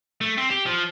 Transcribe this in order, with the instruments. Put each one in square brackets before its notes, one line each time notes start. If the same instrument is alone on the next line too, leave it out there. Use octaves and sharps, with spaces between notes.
[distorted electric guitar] A3
C4
G4
F3